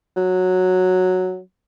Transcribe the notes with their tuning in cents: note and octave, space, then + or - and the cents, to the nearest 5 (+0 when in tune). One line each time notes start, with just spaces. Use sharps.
F#3 -5